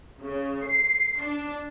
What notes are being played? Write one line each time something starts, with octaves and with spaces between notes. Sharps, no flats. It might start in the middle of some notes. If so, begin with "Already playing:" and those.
C#3
C7
D4